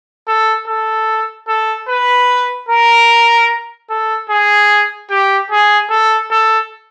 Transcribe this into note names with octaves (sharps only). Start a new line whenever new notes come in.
A4
A4
A4
B4
A#4
A4
G#4
G4
G#4
A4
A4